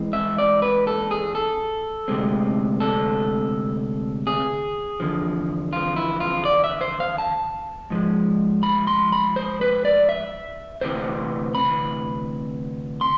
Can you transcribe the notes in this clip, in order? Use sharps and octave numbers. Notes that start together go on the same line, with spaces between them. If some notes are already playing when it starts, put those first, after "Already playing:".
Already playing: G#2 E3 G#3 C4
E5
D5
B4
A4
G#4
A4
D2 C3 G#3 C4
A4
G#4
E2 D3 F3
F4
E4
F4
D5
E5
C5
F5
A5
G#2 F3 G#3
B5
C6
B5
C5
B4
D5
E5
D2 C3 E3 B3 C5
B5
C6